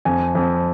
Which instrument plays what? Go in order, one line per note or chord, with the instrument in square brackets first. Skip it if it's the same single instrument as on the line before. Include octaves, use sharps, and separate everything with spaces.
[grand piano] F2 G#5
F2